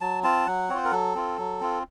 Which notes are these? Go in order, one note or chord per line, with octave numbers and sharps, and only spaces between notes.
F#3 A5
C4 F4 A5
F#3 F#5
C4 F4 C5 C#5
A#4
F#3 A4
C4 F4
F#3
C4 F4